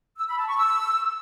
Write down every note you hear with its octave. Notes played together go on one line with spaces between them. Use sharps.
E6
B5
A5
C#6
E6